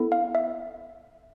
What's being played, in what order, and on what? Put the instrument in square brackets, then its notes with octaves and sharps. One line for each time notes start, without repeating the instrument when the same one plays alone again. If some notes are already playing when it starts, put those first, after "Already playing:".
Already playing: [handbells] B3 E4 A4
F5
E5